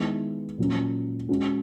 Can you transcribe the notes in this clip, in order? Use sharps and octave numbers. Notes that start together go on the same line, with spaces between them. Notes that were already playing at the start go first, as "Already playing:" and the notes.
Already playing: D#3 G#3 B3 E4
A#2 F#3 C#4
G#3 C#4 F#4